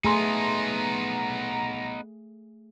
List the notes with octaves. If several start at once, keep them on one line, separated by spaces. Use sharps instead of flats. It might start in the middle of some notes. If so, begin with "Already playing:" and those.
A3 B3 D#4 G#4 G#5 A#5 C6